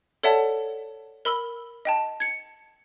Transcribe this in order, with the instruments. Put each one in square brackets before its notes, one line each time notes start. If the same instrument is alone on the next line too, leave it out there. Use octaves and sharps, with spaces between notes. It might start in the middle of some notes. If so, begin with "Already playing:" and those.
[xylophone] A4 C#5 D5 E5 F#5 A5
A#4 B5 E6 G7
D#5 G5 A5
G#6 C#7